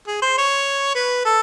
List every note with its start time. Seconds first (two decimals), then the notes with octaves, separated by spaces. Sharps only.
0.08 G#4
0.22 C5
0.38 C#5
0.95 B4
1.25 A4